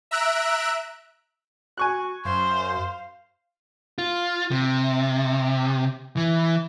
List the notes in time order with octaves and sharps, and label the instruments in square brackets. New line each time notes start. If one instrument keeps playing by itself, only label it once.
[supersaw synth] E5 A#5 E6 F#6 D7
[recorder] F#4 [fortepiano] G#5 C#6 F#6
[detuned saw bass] F#2 [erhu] C5 [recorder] F5
[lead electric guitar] F4
C3
E3